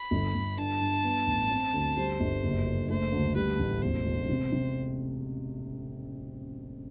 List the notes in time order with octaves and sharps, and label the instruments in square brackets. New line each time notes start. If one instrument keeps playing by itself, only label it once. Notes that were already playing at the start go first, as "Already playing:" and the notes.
Already playing: [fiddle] B5
[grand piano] G1
G1
[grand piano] G2 [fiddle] A5
[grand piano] G2
B3
A1
C4
D2
[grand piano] G3 [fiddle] C5
[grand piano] G1
F#1
F#1
[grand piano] A3 [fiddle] C5
[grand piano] D2
[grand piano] G3 [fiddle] B4
[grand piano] A1
[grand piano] E1 [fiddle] C5
[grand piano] E1
C3
C3